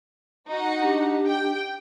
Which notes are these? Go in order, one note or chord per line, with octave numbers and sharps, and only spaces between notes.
D#4 F#4 F#5
D4 G4
G5